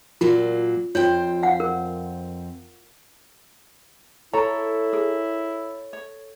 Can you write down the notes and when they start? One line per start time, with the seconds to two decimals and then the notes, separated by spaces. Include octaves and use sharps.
0.21 A#2 F#3 A#3 F4
0.95 F2 F4 C5 C#5 G5
1.43 F5 F#5
1.60 A#4
4.33 E4 A4 C#5 A#5
4.93 G#4 A#4
5.93 C#5